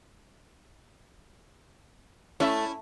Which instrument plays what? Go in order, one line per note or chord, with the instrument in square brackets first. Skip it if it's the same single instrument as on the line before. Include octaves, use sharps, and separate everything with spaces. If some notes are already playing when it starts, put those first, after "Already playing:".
[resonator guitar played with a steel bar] A3 [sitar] C#4 E4 E5